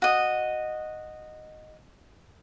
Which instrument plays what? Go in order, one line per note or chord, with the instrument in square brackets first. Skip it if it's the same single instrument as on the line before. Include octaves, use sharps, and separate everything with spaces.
[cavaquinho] F#4 D#5